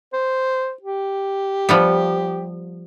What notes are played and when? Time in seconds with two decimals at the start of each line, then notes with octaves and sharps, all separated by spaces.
0.13 C5
0.82 G4
1.69 F3 G3 B3